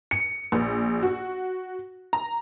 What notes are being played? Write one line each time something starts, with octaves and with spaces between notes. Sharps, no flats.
C#7
A#1
F#4
A#5